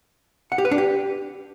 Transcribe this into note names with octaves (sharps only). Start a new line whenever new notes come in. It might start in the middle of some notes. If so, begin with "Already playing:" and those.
F#5
G4
B4
D4
G4